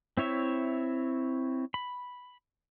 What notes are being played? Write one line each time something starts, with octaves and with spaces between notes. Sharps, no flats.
C4 E4 C#5 E5
B5